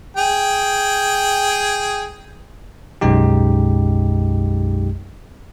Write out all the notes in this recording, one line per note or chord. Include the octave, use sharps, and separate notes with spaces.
G#4 G5
B1 F#2 G#3 D#4 G4